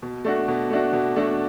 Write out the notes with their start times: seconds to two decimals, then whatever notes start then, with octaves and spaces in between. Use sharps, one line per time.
0.02 B2
0.24 A3 D4 F#4
0.48 B2
0.70 A3 D4 F#4
0.93 B2
1.16 A3 D4 F#4